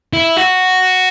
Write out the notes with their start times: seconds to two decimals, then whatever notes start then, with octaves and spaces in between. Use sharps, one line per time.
0.13 E4
0.37 F#4